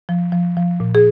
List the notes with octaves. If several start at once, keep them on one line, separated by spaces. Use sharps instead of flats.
F3
F3
F3
A#2
G#4